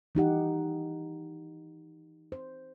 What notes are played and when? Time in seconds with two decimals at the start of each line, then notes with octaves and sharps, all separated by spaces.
0.15 E3 D#4 G4 F#5
2.32 C5